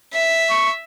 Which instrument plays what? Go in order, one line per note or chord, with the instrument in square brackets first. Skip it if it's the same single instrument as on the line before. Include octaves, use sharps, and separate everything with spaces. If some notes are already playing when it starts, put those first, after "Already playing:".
[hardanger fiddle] E5
[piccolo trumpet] C#6